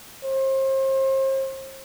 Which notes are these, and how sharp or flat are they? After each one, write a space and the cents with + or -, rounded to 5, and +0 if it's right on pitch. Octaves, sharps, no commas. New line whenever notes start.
C5 +35